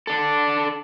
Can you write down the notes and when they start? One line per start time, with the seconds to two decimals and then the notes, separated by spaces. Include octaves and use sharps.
0.07 D4 A4